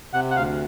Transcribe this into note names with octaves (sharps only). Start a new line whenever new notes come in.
C3 F#5
F#5
D2 F5